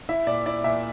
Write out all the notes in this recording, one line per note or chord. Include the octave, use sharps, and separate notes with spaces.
E4 E5
A#2 D5
E4 D5
A#2 E5